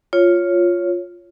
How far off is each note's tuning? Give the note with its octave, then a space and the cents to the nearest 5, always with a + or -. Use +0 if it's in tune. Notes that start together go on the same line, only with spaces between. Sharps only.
F4 +0 C#5 +0